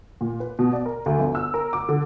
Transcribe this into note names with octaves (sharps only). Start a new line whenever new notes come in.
A#2
B4
B2
D5
A#4
D2
G1
E6
A#4
D6
D3